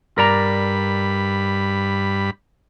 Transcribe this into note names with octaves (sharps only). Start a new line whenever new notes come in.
G2 A#4 D5 A#5 B5